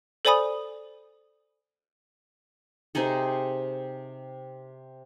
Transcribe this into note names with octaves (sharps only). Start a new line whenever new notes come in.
A4 C5 D5 G#5 B5 D#6
C3 D#4 G#4 A4